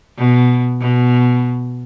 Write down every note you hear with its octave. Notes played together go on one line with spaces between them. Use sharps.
B2
B2